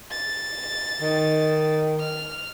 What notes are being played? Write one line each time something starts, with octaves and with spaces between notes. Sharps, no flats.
A6
D#3
F6